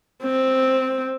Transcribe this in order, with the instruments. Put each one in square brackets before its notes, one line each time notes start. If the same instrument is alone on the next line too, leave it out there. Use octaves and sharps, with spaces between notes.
[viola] C4